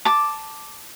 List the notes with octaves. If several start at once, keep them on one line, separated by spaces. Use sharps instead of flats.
A5 D6